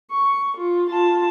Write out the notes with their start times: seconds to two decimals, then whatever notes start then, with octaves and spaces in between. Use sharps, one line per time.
0.12 C#6
0.57 F4
0.90 F4 A5